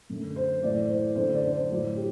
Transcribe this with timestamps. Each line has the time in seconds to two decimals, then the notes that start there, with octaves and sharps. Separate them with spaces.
0.10 F#2 D3 A3
0.36 C5
0.63 A2 E3 A3 D5
0.89 C5
1.16 F#2 D3 A3 C5
1.34 D5
1.51 C5
1.69 A2 F#3 A3
1.96 G4